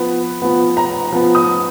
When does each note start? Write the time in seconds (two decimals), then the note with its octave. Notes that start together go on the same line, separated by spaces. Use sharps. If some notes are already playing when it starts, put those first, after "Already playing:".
Already playing: F3 B3 B4
0.42 F3 B3
0.77 A#5
1.13 F3 B3
1.35 D#6